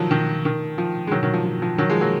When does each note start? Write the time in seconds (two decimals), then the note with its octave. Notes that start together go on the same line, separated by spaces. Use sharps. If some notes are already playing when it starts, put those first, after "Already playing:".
Already playing: D#3 F3 F#3
0.11 D#3
0.45 D#3
0.78 F3
1.07 G#3
1.11 D#3 F#3
1.23 D#3 F#3
1.34 F3
1.45 F3
1.62 F3
1.78 D#3 F#3
1.90 F3 G#3
2.01 F#3 A#3